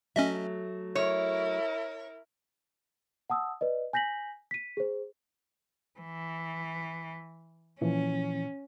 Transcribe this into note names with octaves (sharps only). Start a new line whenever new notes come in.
F#3 A3 C#4 D#5 E5
E4 A#4 C#5
F#5 A5 D#6 E6
B4 D5 D#5
G#5 G6 A#6 B6 F#7
B6 D#7
G#4 C5
E3
A#2 E3 F3 C#4